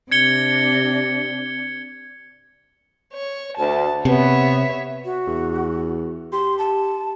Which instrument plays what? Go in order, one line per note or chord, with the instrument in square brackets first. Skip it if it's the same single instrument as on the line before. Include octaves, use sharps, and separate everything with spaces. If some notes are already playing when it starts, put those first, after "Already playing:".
[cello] C3 D4 [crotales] G#6 C#7 G7
[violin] C#5
[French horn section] D2 [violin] A5
[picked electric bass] C3 [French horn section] B3 [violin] C#5 E5
[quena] F#4
[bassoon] E2
[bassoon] G4 [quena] C6
[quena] A5